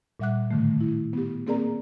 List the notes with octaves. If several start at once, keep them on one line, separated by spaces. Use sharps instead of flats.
A#2 G3 E5 F#5 D6 F#6
A2 D3 D#3 A3
E4
B3 G4
A#3 C4 G#4 A#4 D5 A#5